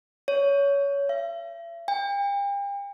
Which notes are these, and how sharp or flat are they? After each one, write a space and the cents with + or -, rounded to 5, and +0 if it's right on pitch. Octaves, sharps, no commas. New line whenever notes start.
C#5 +20
E5 +40
G5 +40